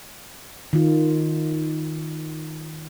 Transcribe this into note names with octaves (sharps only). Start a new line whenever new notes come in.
D#3 F4